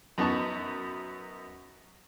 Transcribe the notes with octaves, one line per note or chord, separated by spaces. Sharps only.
F#2 B3 D#4 A5 C#6